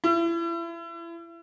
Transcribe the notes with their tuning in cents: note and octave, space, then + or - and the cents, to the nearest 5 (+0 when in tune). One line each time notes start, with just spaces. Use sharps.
E4 +35